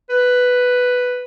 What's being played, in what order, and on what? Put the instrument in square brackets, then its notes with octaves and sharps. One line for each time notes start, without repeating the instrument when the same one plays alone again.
[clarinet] B4